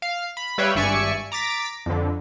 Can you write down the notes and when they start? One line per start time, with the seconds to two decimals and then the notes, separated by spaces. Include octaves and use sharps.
0.02 F5
0.37 B5
0.58 G3 B4 C#5 E5 F5 G5
0.75 G#1 G2 D5 E5 G#5 C#6
1.32 A#5 D6 A6 B6
1.86 F2 D3